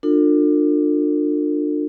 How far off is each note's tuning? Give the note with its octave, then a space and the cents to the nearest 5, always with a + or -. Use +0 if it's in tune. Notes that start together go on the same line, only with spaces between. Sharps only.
D4 +30 F4 +30 A4 +40